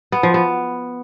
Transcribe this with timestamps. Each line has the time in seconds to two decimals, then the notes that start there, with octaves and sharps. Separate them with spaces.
0.12 B3
0.23 F3
0.34 B3